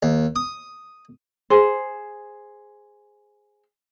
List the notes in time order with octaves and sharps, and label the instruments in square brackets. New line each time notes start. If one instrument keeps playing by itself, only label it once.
[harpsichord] D#2
D#6
[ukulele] G#4 C5